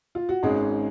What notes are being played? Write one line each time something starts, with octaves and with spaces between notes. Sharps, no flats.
F4
F#4
G#1 G#2 G#3 C#4 G#4